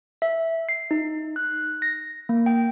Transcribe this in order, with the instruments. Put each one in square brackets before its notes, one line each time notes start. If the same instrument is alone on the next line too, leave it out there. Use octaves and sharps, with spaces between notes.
[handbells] E5
C7
D#4
F#6
A#6
A#3
G5